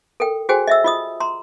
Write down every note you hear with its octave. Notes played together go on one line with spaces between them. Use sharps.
A4 A#4 G5
F#4 G#4 C5 G5 G#5
D#5 E5 E6
F4 D#5 D#6
A#5 C6